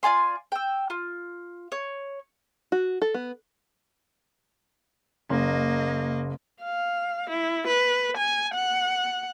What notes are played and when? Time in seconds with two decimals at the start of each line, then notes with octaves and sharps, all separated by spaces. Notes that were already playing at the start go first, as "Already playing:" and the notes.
0.03 F4 D5 G#5 C6
0.52 G5 E6
0.90 F4
1.72 C#5
2.72 F#4
3.02 A4
3.14 B3
5.30 F#1 A#3 D#5
6.64 F5
7.30 E4
7.67 B4
8.17 G#5
8.55 F#5